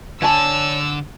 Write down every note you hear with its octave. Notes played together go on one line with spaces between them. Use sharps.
D3 C#5 D5 G#5 A5 E6